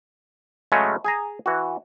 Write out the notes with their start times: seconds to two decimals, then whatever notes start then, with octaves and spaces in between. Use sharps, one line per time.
0.72 C#3 F#3 G#3 A3 C#4
1.05 G#4 G#5 A#5
1.46 E3 F#4